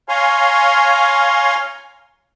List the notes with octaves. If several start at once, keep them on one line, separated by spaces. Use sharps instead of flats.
C#5 F5 G#5 A#5 C6